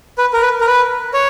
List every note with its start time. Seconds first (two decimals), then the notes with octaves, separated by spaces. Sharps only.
0.18 B4
0.33 A#4
0.42 B4
0.61 A#4
0.67 B4
1.14 C#5